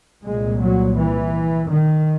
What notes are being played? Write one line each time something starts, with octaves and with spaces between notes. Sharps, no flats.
C2 A#2 G#3
F#3
E3
D#3